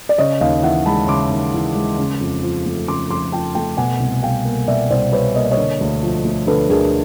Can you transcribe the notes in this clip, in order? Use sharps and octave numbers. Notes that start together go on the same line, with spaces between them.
D5
C#3 C#5 D#5
D#2 D#5 F5
E3 E5 F#5
G#3 A5 B5
C#3 C6 D6
D#2
E3
G#3
C#3
F2
F3
A3
C#3 C6 D6
F2 C6 D6
F3 G5 A5
A3 G5 A5
B2 F#5 G#5
C2
G3 F5 G5
A#3
B2 D5 E5
C2 C5 D5
G3 B4 C#5
A#3 D#5
D5
C#5 D#5
D3
D2
F3
A3
D3 A4 B4
D2 G#4 A#4